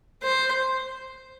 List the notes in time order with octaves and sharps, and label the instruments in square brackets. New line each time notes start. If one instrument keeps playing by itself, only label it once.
[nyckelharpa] C5